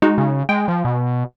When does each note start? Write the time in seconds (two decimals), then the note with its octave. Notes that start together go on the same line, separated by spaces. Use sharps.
0.02 G#3 D#4 F#4
0.18 C#3
0.49 G#3 G5
0.68 F3
0.85 B2